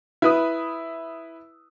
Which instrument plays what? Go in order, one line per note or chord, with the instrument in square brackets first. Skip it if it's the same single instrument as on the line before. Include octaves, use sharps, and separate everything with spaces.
[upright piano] E4 B4 D#6